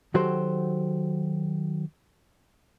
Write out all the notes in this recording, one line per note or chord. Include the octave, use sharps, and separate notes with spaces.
D#3 F#3 F#4 G4 A4 C5